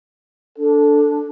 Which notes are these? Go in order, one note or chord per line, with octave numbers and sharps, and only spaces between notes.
D4 A4